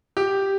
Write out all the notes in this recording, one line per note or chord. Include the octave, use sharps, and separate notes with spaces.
G4